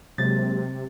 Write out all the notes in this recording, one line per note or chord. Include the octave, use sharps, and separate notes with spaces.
C3 F#3 G#3 A#3 A6